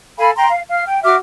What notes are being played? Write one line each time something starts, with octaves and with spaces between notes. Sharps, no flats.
A4 F5 G#5 B5
G5 A#5 C6
F5
F5 F6
G5
F#4 E5 D6 F6